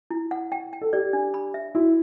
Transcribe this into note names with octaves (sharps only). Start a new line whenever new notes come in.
E4
F#5
G5
G5
A4
G4 D5
D4
B5
E5
E4 F#4